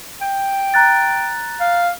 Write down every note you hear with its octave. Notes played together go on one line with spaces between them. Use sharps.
G5
A#5 F#6 A6
F5